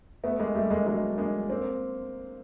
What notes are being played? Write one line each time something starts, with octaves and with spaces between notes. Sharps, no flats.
A3 B3
G#3 A#3
G3 A3
G#3 A#3
F#3 G#3
G#3 A#3
A#3 C4